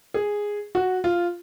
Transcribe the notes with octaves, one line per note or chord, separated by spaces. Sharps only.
G#4
F#4
F4